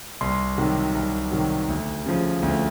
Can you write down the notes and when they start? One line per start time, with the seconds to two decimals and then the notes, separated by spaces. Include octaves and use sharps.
0.21 C2 C6
0.57 C3 D#3 F#3
0.95 C2
1.31 C3 D#3 F#3
1.69 D2
2.06 C#3 F3
2.42 D2